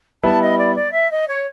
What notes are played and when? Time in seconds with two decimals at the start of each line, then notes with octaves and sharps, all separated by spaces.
0.23 G3 B3 E4 A5
0.40 D#5
0.58 D5
0.75 D5
0.92 E5
1.10 D#5
1.27 C#5